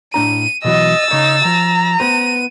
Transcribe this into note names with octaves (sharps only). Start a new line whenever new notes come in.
A2 D4 A#5 D#7
B2 E3 F#3 D#5 E6 A6
C#3 D#4 C#5
F3 A#5
B3 C5 D#7